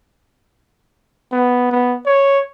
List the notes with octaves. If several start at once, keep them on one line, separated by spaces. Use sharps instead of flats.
B3
B3
C#5